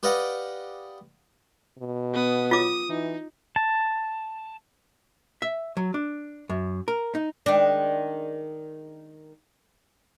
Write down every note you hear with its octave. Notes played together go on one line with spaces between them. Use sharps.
G4 B4 D5 D#5 F5 F#5
B2
B3 D#6
F4 D6 D#6
E3 D#4
A5
E5
F#3
D4
F#2
A#4
D#4
D#3 G#3 D4